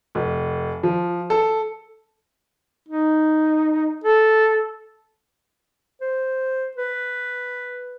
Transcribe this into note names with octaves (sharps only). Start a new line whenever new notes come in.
F1
F3
A4
D#4
A4
C5
B4